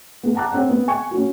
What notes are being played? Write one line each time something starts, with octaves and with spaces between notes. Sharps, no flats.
B3 G#4
F#5 A5 A#5 D6 F#6
C4 C#5 F#5
B3
G#5 C#6
C#4 F#4